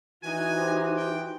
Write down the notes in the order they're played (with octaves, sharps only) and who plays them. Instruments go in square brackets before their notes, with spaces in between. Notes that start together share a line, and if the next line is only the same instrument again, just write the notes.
[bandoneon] E3 [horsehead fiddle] D#4 F#4 [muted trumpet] G#5
[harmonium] G4 C5
[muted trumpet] G5